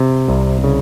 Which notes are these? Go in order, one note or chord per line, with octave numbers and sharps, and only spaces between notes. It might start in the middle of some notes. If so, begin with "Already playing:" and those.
Already playing: C3
C2
C#3